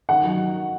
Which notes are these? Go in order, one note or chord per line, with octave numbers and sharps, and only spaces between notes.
D#3 F#5
F#3